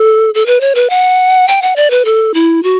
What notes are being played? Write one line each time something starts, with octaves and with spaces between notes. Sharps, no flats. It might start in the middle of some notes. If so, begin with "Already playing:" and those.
Already playing: A4
A4
B4
C#5
B4
F#5
G5
F#5
D5
B4
A4
E4
F#4